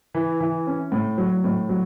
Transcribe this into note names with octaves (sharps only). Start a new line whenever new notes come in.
E3
E3
C#4
A2
F#3
A2
F#3